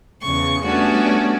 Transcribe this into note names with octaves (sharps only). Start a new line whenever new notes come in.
E2 C#3 C#6
G3 A3 B3 C#4 D4 F#4